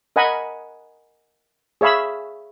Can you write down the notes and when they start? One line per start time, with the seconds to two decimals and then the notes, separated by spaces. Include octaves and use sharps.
0.16 A#4 D#5 F#5 G#5 B5
1.81 G#4 C#5 E5 F5 B5 E6